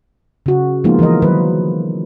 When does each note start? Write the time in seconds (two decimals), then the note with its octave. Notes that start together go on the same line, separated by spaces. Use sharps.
0.46 C#3 F#4
0.84 F3 G#3 A#3 B3 D#4 F4
0.99 E3 F3 A#4 D#5
1.22 D#3 F#3 B4